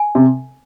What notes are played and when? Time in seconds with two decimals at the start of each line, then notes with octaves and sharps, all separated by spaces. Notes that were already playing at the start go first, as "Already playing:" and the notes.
Already playing: G#5
0.15 C3